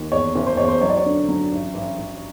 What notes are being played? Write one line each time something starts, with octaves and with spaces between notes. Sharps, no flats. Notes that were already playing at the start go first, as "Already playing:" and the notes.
Already playing: D#2
E2 C#5
F#1
C5
E2 C#5
C5
F#3 C#5
D5
C#5
D3
F#3
A1
A1
A1